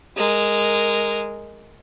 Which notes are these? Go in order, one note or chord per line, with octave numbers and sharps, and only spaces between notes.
G#3 A#4